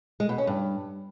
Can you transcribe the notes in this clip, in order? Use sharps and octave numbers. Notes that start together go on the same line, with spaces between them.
G#3
B2
C#4
G2